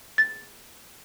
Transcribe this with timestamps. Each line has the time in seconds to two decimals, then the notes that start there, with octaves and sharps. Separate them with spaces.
0.18 A6